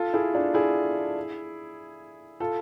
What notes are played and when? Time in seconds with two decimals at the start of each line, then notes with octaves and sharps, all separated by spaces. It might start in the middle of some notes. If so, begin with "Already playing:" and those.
Already playing: F4 A4
0.13 E4 G#4
0.33 D4 F4
0.54 E4 G#4
2.40 F4 A4